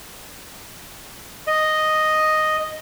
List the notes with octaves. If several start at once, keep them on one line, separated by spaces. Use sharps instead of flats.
D#5